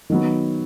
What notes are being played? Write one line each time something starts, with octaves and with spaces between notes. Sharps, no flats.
D#3 F#3 B3